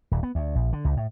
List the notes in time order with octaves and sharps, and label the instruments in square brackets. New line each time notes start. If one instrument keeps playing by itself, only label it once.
[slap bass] D#1
B3
D2
A#1
D3
C#2
A2